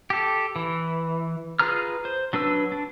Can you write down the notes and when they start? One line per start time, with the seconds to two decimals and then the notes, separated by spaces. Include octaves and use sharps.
0.10 G4 A4
0.56 E3
1.59 F4 G#4 B4 A#5 F6
2.05 C5
2.33 F#3 D4 B4 E6
2.72 D4